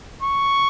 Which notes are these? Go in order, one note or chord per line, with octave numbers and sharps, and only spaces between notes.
C#6